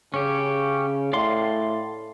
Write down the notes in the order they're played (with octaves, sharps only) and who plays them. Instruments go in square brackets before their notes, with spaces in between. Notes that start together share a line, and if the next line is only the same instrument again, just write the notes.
[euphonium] C#3 [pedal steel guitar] C#4 G4
[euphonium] A2 [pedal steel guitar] D5 F5 C6